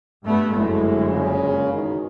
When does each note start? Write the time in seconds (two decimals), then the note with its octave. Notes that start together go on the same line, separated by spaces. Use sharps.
0.24 G2 A3 B3
0.55 G1 F#2 G#3 A3 E4
1.11 A#2 C#3
1.71 E2 B2 D#3